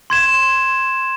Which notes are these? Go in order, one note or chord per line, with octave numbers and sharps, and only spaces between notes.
C6 G#6 E7